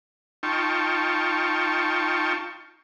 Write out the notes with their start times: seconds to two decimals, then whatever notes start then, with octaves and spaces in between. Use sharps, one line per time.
0.43 D#4 F4 G5 A5 C#6